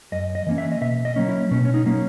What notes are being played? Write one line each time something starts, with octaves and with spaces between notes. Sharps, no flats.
F#2 D#5
D#5
E3 A#3 C#4
E5
D#5
B2 E5
D#5
F#3 A#3 C#4
E4
B2 C#4
C#4
D#4
F#3 A#3 C#4